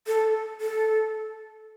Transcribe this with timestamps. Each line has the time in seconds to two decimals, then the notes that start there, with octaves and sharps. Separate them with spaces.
0.07 A4
0.61 A4